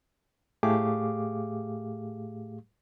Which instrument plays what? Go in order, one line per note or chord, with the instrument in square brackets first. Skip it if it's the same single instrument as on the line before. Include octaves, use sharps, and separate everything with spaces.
[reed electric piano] A2 A3 G4 G#4 F5 D6